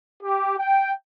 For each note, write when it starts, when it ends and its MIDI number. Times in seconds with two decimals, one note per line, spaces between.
0.23 0.56 67
0.59 0.91 79